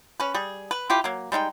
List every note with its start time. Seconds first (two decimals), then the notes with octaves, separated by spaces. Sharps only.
0.20 C#4 B4
0.35 G3 G#4
0.71 B4
0.90 E4 F4 G4
1.04 F#3 A#3
1.32 G3 G#3 D#4 G5